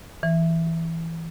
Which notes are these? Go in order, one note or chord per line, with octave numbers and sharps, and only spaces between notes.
E3